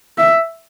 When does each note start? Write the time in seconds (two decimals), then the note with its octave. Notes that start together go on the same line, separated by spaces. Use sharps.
0.18 E5